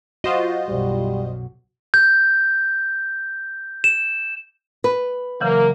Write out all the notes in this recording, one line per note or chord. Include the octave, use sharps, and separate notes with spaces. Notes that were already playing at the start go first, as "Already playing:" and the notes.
F4 F#4 C5 D#5
B1 F#2 G3
G6
E7
B4
C#3 E3 F#3 A#3